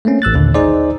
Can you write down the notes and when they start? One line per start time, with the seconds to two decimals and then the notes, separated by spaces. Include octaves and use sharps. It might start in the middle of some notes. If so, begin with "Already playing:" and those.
0.05 A3 A#3 C4 C#4
0.22 A1 E6 F#6 A6
0.34 D#2 A#2 D3
0.55 D#4 G#4 C5 D5